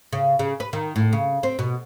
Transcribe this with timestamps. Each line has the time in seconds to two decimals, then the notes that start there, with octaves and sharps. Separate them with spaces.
0.12 C#3
0.39 C#3
0.60 B4
0.73 D#3
0.96 A2
1.13 C#3
1.43 C4
1.59 B2